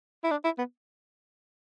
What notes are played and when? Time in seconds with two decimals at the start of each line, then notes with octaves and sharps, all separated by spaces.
0.24 E4
0.31 D4
0.44 E4
0.58 B3